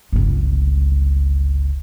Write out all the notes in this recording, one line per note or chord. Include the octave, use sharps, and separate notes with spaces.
G1 C#2